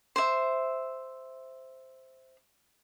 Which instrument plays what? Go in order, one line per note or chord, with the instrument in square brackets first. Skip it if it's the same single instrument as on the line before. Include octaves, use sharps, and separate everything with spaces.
[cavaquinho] C5 E5